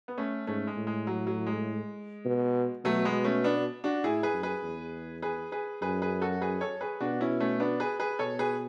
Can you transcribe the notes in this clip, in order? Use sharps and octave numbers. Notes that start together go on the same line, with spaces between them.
B3
A3 C#4
G#2 A3 C#4
G#3
A2
G#3
F#3
F#3
G#3
B2
B2 F#3 A3
G#3 B3
A3 C#4
B3 D4
D4 F#4
A2 E4 G#4
G#4 B4
F#2
G#4 B4
E2
G#4 B4
G#4 B4
F#2 G#4 B4
G#4 B4
F#4 A4
G#4 B4
A4 C#5
G#4 B4
B2 D4 F#4
C#4 E4
A3 C#4
B3 D4
G#4 B4
G#4 B4
B2 A4 C#5
G#4 B4